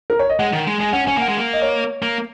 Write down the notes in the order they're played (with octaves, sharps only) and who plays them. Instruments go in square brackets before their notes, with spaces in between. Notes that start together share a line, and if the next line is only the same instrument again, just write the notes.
[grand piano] A#4
C#5
D#5
[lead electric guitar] G#3 [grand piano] F#5
[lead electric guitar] D#3
G#3
[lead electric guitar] G#3 [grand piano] G#5
[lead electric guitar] C#4 [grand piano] F#5
[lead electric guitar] C#4 [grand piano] G#5
[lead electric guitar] A#3 [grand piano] F#5
[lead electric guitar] G#3
A#3
[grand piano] D#5
C#5
[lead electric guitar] A#3